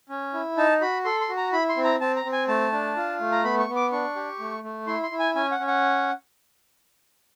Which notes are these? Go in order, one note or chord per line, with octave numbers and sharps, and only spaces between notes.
C#4
E4
D#4 A5
F#4 B5
A4 C6
C6
F#4
A#5
E4 B5
C6
C4
A#5
C4 A5
A#5
C4
G#5
A3 A5
D4
F4
A3
A#5
B3 B5
C#6
B3
D6
D4 C#6
G4
A3
A3
E4 C6
C6
E4
G#5
C#4 G#5
F#5
C#4
F#5